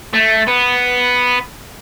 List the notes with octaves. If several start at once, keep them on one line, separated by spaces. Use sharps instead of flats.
A3
B3